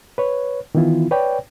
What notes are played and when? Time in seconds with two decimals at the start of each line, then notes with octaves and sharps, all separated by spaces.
0.18 B4 C#5
0.75 D#3 E3 B3 E4 F4
1.11 B4 C#5 D5 G5